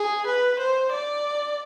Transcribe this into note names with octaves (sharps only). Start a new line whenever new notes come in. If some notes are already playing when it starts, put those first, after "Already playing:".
Already playing: G#4
B4
C5
D5